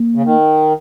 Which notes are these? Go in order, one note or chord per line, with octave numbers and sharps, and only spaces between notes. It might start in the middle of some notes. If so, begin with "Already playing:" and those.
Already playing: A#3
C#3
D#3